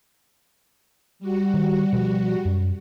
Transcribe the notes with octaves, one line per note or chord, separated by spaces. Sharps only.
G3 F#4
D#3
B2 F3
F#2